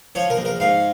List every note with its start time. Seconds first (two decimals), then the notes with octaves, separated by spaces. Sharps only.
0.15 F3 C#5
0.30 A#4
0.37 A#1
0.45 A#4
0.60 G#2 F5